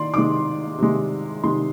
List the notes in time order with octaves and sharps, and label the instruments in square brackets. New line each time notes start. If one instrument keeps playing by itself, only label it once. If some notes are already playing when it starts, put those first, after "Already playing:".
Already playing: [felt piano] D#3 D5 C6
C3 D#3 G#3 D6
C3 D#3 G#3
C3 D#3 G#3 C6